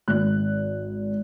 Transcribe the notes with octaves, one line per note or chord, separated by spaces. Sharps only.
G#1 F#6